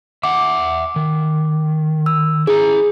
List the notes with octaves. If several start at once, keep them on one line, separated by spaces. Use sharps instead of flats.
E5 F#5 D6
D#3
E6
E4 G#4 A#5